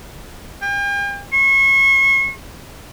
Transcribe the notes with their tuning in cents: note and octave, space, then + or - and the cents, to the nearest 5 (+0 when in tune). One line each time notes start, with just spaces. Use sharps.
G5 +45
C#6 -35